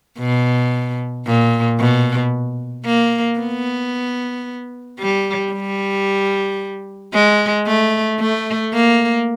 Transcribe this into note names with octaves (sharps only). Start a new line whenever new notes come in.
B2
A#2
B2
A#3
B3
G3
G3
G#3
A3
A3
A#3